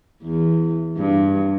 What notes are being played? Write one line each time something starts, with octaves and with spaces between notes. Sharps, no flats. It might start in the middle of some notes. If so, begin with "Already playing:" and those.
E2
G2